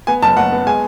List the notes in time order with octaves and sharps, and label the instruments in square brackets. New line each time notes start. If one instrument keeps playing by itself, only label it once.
[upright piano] B3 G#5
F#1 A5
F#1 F#5
B3
G#3 G#5